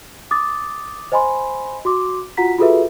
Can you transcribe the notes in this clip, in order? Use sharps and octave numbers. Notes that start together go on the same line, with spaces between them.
D6 D#6 A6
C5 D#5 G#5 B5 C6
F#4 C6 D6
F4 F#4 F#5 A#5 B6
F4 F#4 G#4 A4 B4 E5